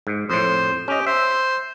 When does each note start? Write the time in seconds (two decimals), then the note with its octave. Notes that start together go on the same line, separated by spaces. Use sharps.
0.07 G#2
0.30 F2 A2 C5
0.88 C#4 G4 D#5
1.07 C5 E5